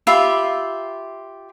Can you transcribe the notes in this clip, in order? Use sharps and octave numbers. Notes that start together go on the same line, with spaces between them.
F4 G4 E5 B5